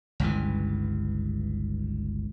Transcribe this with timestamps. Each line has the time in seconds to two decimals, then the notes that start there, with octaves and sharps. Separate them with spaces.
0.20 G1 C#2 G2 E3